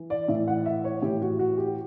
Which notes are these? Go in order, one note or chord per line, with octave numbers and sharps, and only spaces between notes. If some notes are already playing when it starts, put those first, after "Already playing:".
Already playing: E3
D5
A2 E3 E5
F#5
E5
C#5
A2 E3 G4
F#4
F#4
G4